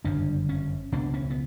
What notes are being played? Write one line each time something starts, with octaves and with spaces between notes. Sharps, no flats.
G1 F#2 C#3 D4
C#4
C#2 B2 D4
C#4
B3